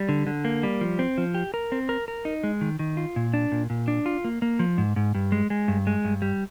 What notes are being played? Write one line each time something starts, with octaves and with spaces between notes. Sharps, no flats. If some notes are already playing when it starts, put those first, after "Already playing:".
Already playing: G3
D3
D3
A#3
G3
F3
C4
F3
G4
A#4
C4
A#4
A#4
D#4
G#3
D#3
D#3
F4
A#2
D4
A#2
A#2
D4
F4
A#3
A#3
F3
G#2
G#2
G2
G#3
G#3
G2
G#3
G2
G3